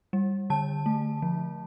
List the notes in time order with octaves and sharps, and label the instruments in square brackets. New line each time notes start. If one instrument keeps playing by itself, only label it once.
[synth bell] G3
D3 A5
A3
F3